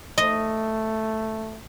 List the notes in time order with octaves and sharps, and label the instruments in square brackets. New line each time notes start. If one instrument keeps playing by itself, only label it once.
[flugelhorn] A3 [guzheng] D#5